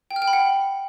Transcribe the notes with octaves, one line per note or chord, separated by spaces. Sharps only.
G5
F6
G5
B5
F#5